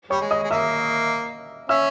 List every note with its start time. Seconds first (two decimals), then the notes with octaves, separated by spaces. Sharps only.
0.10 G3 C#5 C#6
0.21 G#3
0.31 D#5 D#6
0.43 G#3
0.51 A#3 E5 E6
1.69 C#4 E5 E6